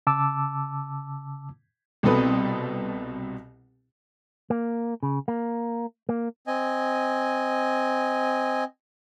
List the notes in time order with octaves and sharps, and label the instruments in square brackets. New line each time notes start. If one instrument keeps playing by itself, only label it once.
[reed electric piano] C#3 A5 D6 E6
[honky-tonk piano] C2 B2 C4 A4 B4 D#6
[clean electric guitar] A#3
C#3
A#3
A#3
[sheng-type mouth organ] C4 D#5 G#5